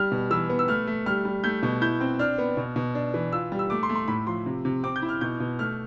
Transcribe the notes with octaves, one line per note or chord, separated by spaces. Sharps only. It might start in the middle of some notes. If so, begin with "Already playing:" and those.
Already playing: G3 F6
B2
E3 E6
B3
E6
A3 F6
A3
G3 F6
G3
A3 G6
B2
E4 G6
C4
D4 F6
B3
B2
B2
D4
E3
F4 E6
G3
E6
A3 D6
C6
A3
C6
A2 B5
F3 C6
C3
C3
C4 D6
G6
E4
F6
B2 G6
B2
A3 F6